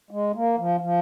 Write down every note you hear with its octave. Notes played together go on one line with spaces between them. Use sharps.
G#3
A#3
F3
F3